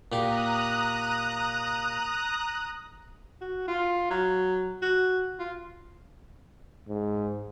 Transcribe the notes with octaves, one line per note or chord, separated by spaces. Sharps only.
A#2 G4 A#5 D#6 F#6
F#4
F4
F#3
F#4
F4
G#2